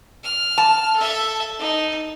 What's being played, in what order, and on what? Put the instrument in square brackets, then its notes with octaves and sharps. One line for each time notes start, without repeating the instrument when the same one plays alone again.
[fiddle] F6
[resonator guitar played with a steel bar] A5
[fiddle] A4 E5
D#4